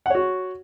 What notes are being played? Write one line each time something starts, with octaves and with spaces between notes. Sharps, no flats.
F#4 C#5 F#5